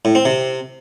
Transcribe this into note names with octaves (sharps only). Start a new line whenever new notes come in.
A2
C4
C3